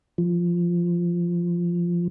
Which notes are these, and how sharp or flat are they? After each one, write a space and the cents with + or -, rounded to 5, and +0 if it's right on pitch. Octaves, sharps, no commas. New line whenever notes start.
F3 -10